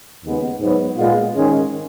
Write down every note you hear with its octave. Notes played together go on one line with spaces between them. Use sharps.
D#2 C#3 G#3 B3
G#2 F#3 B3
A#2 G#3 B3 F4
G#2 D#3 G#3 C#4